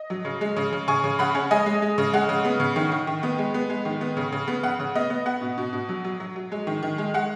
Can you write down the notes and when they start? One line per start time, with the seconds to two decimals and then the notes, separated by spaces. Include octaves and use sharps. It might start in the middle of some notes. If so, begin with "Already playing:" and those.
Already playing: D#5
0.10 F#3
0.25 C#3
0.41 G#3
0.56 C#3
0.72 C#3
0.88 C#3 G#5 C#6
1.04 C#3
1.19 C#3 F#5 B5
1.35 C#4
1.51 G#3 D#5 G#5
1.66 G#3
1.82 G#3
1.98 C#3
2.13 G#3 F#5
2.29 C#3
2.45 B3
2.60 C#3
2.76 D#3
2.92 D#3
3.07 D#3
3.23 B3
3.38 G#3
3.54 B3
3.70 G#3
3.85 D#3
4.01 B3
4.17 C#3
4.32 C#3
4.48 B3
4.63 C#3 F#5
4.80 C#3
4.95 B3 D#5
5.10 B3
5.26 B3 F#5
5.41 B2
5.58 B2
5.73 B2
5.89 F#3
6.04 F#3
6.20 F#3
6.36 F#3
6.52 G#3
6.67 D#3
6.83 D#3
6.98 G#3
7.14 G#3 F#5